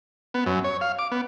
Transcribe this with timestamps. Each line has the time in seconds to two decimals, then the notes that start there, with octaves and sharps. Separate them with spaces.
0.34 B3
0.46 F#2
0.64 C#5
0.81 F5
0.99 D6
1.12 B3